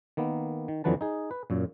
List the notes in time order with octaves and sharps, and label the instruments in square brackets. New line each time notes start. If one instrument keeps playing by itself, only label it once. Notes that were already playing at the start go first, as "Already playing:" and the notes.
[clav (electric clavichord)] D#3 A#3 B3
D#3
F2 D3 E3 F#3 B4 A5
D#4 G#4
B4
F#2 A#2